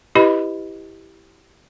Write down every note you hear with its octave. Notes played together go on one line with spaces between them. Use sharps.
E4 G4 B4 D#5 B5